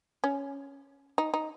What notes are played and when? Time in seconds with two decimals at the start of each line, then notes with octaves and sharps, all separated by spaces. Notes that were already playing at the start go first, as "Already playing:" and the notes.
0.24 C#4
1.18 D#4
1.34 D#4